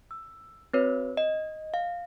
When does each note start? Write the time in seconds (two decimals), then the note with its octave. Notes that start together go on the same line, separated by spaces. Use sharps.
0.11 E6
0.73 C4 F#4 B4 C#5
1.17 D#5
1.74 F5